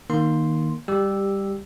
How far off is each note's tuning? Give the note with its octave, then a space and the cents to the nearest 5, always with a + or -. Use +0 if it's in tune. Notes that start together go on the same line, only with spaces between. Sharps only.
D#3 +0 A#3 +10 C6 +0
G3 +15 G4 +0 E6 +0